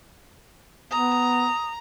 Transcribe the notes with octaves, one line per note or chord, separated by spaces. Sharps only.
B3 A#5 D#6